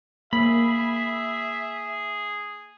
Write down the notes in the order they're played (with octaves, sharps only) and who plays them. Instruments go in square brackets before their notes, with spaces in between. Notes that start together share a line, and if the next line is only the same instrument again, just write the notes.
[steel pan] A#3 [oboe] G#4 [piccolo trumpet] E5 [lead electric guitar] B5